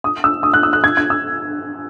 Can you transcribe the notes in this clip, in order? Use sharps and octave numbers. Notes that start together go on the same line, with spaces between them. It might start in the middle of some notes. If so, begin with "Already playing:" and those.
D#6
E6
D#6
F#6
E6
F#6
G#6
G#6
E6